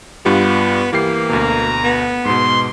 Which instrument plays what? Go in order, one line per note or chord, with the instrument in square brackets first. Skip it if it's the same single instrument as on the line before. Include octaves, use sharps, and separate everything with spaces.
[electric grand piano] G2 F4 G4 [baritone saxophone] B3
[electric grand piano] E3 G4 C7 [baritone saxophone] A#3
[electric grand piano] D2 B2 [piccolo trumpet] A#5
[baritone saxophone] B3
[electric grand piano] G#2 B2 [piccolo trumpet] C6